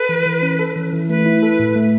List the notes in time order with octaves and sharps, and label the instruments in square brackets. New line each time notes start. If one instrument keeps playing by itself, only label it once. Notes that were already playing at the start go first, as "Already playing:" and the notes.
Already playing: [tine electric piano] A4 [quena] B4
[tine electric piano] E3
E3
C#4
A4
E3
E3
[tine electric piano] A3 [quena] B4
[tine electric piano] E4
A4
A2
A3